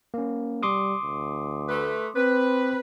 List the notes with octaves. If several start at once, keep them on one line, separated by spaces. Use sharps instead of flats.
A#3 C#4
G3 C6 D6 D#6
D2
A3 B4
C4 B4